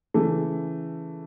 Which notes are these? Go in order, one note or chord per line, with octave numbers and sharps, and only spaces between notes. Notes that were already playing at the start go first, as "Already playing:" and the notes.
C#3 E3 A3